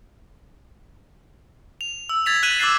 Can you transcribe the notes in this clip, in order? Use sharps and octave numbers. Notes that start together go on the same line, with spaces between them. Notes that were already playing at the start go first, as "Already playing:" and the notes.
F7
E6
G#6 A6 B6 F7
F#6 B6 D#7 E7 F#7
D6 E6 F#6 A6 C7